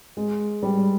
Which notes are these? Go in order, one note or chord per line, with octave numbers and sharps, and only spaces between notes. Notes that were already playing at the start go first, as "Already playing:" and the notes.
G#3
G3